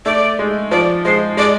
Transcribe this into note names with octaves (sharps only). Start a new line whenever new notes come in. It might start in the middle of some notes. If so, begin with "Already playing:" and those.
A3 D5
G#3
F3 D5
G#3 C5
G#3 D5